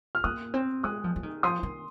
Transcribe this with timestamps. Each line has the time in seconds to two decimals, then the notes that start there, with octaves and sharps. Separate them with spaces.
0.15 F6
0.24 A#3 D#6 F#6
0.54 C4
0.83 G#3 D#6 F#6
1.04 F3
1.16 F3
1.23 D#3
1.43 F3 C6 D#6
1.63 D#3